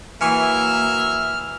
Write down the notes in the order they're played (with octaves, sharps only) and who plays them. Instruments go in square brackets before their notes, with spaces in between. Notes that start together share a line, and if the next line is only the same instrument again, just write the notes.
[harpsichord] E3 C#6 D#6 [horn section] F#3 A#4 E5 [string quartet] A#3 [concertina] F6